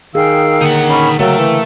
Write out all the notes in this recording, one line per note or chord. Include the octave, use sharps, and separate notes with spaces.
D#3 G#4 F5 G5 E6
D3 A#3 D#4 F#5
C#4 B5
C#3 F#3 A3 A#4 F5 G5 E6
E3